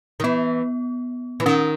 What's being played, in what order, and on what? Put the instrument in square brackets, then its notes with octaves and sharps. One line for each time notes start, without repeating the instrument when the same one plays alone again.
[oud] D#3
[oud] E3 [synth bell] B3
[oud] E3
[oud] D#3 [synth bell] C#4